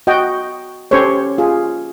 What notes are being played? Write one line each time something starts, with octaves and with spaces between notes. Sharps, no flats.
F#4 D#5 G5
C#4 G4 A4 C5 C#5
F4 G#4